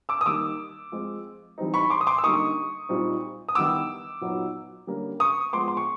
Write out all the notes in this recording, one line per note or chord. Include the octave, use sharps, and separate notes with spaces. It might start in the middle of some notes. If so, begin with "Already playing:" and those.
D6 E6
D#6
D#3 G3 A#3 D#4 D6 E6
F3 G#3 C4 F4
E3 G3 C4 D#4
B5 C#6
C6 D6
D#6
C6 D6
E6
D3 G3 A#3 D#4 C#6 D#6
A#2 G3 C4 D#4
D#6
D#3 G3 B3 E4 D6 E6
A#2 F#3 B3 D#4
D3 G3 A#3 C#4
C#6 D#6
F3 G#3 B3 C6 D6
C6
C#6